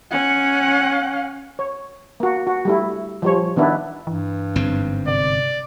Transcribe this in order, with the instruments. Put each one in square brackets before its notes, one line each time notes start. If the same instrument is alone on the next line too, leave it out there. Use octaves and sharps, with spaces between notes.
[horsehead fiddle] C#4 F#5
[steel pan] C#5
A#3 F#4
F#4
G3 A3 E4
F3 G3 C#5
D#3 B3 D4 E4
[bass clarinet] G2 [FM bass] E3
[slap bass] G1 G#2 C4
[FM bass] C3 [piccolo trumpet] D5